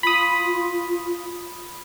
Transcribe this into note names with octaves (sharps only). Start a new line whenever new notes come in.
F4 B5 D#6